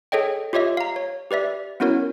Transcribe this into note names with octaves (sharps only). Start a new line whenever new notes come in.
G#4 A4 C#5 D#5 G5
F4 G4 C#5 D#5 E5
F5 A#5
C#5
G4 B4 D5 E5
B3 C#4 E4 F#4 A#4 C#5